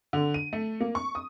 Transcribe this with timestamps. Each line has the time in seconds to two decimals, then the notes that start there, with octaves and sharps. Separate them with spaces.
0.13 D3
0.34 D#7
0.53 A3
0.81 A#3
0.95 C#6
1.15 D#6